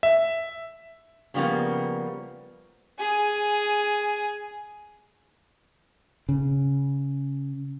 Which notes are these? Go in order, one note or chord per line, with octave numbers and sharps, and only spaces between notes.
E5
C#3 F3 G3 A#3 B3
G#4 G#5
C#3